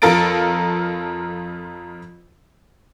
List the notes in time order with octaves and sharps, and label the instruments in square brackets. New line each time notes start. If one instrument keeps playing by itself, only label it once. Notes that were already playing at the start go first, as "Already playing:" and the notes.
[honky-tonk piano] F2 F4 A4 A#4 A6 D7